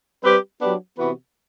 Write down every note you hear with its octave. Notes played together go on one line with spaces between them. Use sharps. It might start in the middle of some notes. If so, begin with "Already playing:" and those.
G3 C4 G4 B4
F#3 B3 D4 G4 B4
C3 E3 B3 F#4 B4